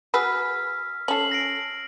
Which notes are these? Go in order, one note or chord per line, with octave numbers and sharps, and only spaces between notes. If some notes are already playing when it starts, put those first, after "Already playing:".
F#4 G#4 B4 E6 F6 B6
C#4 A4 C7 F#7
A#6 C7 D7